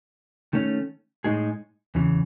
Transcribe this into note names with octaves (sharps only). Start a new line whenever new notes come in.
D#3 A3 C#4
A2 G#3 D#4 G#4
E2 C#3 E3